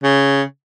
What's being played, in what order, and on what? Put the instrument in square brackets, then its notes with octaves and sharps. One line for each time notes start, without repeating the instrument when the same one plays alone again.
[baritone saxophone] C#3